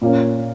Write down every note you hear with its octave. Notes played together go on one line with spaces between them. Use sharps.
A#2 A#3 C#4